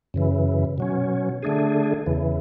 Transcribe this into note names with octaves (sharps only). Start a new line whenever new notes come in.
F#2 C#3 E3
B2 F#3 C#4
D3 A3 D4 G#4
E2 C#3 E3